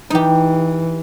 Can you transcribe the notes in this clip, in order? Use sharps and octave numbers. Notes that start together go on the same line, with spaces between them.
E3 D#4 G4